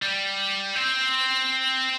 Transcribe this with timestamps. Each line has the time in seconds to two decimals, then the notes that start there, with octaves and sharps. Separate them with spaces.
0.02 G3
0.76 C4